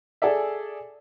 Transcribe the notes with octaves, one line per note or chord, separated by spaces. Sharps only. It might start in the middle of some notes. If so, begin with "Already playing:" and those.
G#4 A4 D5 E5